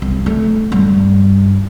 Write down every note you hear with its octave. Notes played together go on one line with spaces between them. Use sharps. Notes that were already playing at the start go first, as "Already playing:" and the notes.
C2
A3
G2